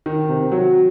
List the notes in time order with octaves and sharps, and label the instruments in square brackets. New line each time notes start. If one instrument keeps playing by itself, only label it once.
[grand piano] D#3
C3
F#3